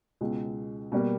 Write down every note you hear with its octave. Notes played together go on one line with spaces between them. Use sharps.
C#2 B2 G#3
B2 G3 A#3